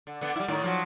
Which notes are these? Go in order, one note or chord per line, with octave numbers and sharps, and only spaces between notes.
D3
D3 B3
G3 E4
A2 D#3
F3 F#3